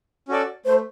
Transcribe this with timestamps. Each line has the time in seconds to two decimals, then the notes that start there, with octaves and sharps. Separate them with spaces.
0.28 C#4 F#4 A4 D5
0.66 A3 C5